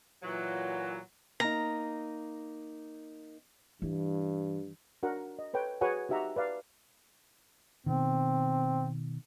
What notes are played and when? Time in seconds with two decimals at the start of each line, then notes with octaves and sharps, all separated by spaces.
0.23 A#2 E3 F#3
1.40 A#3 D#4 A#5
3.82 G2 E3
5.03 D4 F#4 A#4 F#5
5.39 D#5
5.54 A4 B4 C#5 G5
5.81 F#4 G#4 B4 C#5 F#5 G#5
6.09 D#4 F#4 G4 E5 F#5 A#5
6.36 B4 D5 F5
7.86 B2 D#3 C4